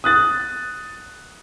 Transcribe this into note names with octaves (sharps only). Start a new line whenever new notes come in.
D#6 F#6 A6